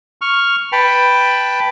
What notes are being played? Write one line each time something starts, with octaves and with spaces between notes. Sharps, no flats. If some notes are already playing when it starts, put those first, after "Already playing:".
C#6 F6
B4 G5 A5 B5